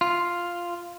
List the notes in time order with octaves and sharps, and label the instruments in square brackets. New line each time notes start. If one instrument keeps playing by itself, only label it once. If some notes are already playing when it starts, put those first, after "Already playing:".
[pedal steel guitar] F4